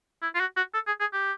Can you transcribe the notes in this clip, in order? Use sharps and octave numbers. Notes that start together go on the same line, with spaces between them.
E4
F4
F#4
F#4
A4
G#4
G#4
G4